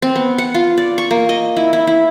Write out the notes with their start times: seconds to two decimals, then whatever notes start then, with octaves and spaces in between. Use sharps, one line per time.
0.02 C4
0.16 B3
0.38 F#5
0.54 F4
0.78 D5
0.98 C#6
1.11 A#3
1.29 D#5
1.57 E4
1.73 E4
1.87 E4